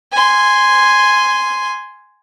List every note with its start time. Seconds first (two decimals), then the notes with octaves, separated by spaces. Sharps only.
0.12 G#5 C6